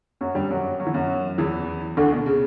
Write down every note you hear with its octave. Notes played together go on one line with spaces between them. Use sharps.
F#2 F#3
G2 G3
F#2 F#3
F#3
E3
F#2 F#3
E2 E3
D2 D3
B2
C#3